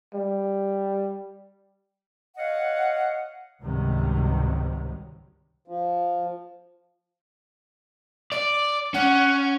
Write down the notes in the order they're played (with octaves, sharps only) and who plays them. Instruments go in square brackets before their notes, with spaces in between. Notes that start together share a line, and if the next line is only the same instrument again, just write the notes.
[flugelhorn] G3
[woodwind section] C#5 D#5 F5 F#5
[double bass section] C#2 G#2 C3 D#3 F#3 G3
[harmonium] F3
[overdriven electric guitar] D5 [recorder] D6
[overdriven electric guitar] C#4 [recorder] F#5